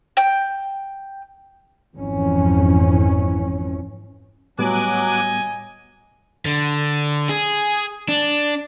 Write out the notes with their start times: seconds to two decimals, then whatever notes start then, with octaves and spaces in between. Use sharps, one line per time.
0.17 G5
1.95 G#1 F2 E3 C#4
4.59 A2 F#3 G3 B3 D#5 G#5 D6 F#6
6.46 D3
7.29 G#4
8.08 D4